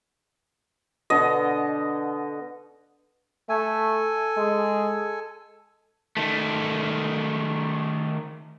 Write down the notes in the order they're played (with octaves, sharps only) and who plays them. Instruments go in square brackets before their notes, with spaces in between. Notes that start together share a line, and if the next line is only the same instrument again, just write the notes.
[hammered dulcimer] B2 D3 [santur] D#5
[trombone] A3 [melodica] A4 G#5
[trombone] G#3
[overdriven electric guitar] D#3 A3